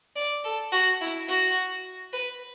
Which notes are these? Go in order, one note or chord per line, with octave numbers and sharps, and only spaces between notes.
D5
A4
F#4
E4
F#4
B4